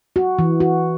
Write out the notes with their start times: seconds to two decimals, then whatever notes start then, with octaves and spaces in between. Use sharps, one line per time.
0.16 F#4
0.39 E3
0.60 F#4